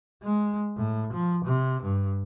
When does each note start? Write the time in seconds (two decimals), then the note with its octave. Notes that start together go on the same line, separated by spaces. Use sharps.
0.23 G#3
0.77 A2
1.13 F3
1.46 C3
1.83 G2